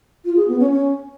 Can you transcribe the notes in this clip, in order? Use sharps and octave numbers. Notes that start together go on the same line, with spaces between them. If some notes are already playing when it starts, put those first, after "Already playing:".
F4
G#4
B3
C#4
C#4